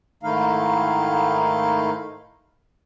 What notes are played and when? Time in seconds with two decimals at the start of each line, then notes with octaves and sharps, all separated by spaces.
0.23 G#2 D#3 A3 D#4 E4 F5